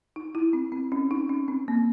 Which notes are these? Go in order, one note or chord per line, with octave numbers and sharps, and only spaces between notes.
D#4
E4
C4
C4
C#4
D#4
C#4
C4
A#3